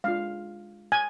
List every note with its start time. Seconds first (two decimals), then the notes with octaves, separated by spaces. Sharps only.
0.04 G#3 D4 F4 F5
0.92 G#5